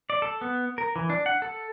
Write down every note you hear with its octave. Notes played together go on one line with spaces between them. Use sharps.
D5
A4
B3
A#4
E3
D4
F#5
A4